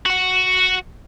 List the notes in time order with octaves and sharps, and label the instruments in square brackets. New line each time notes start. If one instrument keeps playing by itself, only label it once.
[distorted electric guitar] F#4 F#5